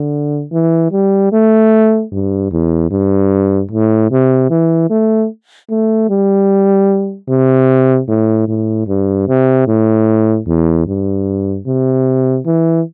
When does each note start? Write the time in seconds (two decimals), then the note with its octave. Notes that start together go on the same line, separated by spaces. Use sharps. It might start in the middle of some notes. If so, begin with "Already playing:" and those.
Already playing: D3
0.52 E3
0.92 G3
1.33 A3
2.12 G2
2.52 E2
2.91 G2
3.71 A2
4.11 C3
4.50 E3
4.90 A3
5.70 A3
6.09 G3
7.28 C3
8.08 A2
8.47 A2
8.87 G2
9.28 C3
9.68 A2
10.47 E2
10.87 G2
11.67 C3
12.46 E3